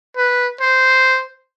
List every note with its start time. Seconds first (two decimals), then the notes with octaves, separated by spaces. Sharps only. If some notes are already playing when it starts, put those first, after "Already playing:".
0.17 B4
0.61 C5